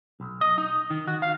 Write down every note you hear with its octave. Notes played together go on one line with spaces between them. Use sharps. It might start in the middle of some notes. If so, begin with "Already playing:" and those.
B1
D#5
D#4
D#3
F#4
F5